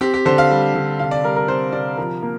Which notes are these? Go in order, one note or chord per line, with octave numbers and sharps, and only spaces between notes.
C4 G4
G4
D3 C5
F5
G3
D3
C3 F5
D5
G3 A#4
A#4
C3 C5
C3 D5
F3 A#4
A#3